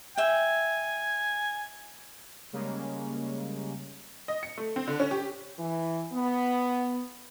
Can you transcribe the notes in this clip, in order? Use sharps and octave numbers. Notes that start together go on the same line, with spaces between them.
E5 G5 G#5
C#3 G3 G#3 A#3 C#4
D#5
C#7
A3
C4
D3
C#4
G4
E3
B3